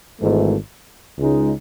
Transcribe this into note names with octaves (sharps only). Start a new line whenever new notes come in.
G#1 G#2 E3 A3
C#2 C#3 G#3 D#4